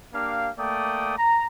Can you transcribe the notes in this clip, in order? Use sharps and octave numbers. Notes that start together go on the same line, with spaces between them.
A#3 D4 G4 F5
A3 A#3 D5 G5 D#6
A#5